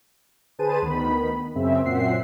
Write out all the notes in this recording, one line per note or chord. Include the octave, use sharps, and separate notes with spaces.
D3 G#4 B4 C5 A5 D#7
D2 D#3 B3 B5
F#2 C#3 C4 E5
F#2 A#2 C4 E5 F#5 C7